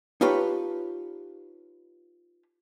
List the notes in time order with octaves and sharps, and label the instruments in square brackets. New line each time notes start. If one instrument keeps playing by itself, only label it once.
[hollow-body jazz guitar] D#4 F4 G4 B4 C#5 A5